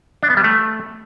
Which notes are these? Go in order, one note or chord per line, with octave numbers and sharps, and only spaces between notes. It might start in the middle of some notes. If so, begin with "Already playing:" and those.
D4
B3
G3
A3